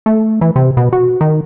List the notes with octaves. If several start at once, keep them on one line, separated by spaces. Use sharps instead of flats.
A3
E3
C3
B2
F#4
D#3